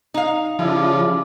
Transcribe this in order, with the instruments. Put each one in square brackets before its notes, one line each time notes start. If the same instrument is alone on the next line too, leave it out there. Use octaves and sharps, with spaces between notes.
[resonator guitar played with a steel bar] D#4 F5
[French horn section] C#3 [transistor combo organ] F3 [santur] G3 E4 D5